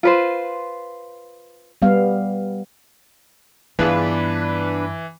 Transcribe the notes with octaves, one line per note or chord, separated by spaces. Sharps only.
F4 B4 C5
G3 B3 F5
G2 E3 B3 D4 F4 G#4 B4